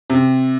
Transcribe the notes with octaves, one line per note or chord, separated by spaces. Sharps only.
C3